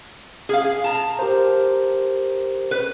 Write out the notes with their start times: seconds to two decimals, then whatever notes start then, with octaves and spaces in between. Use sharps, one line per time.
0.49 G#4 F5
0.84 A5 A#5
1.19 G4 A#4 C5
2.71 B4